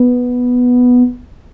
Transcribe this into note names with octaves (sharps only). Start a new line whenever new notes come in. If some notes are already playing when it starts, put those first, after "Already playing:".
Already playing: B3